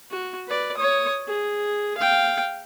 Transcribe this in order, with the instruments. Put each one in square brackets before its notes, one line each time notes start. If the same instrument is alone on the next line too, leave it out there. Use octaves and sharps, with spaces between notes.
[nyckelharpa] F#4
B4 D5
C#5 D#6
G#4
F5 G5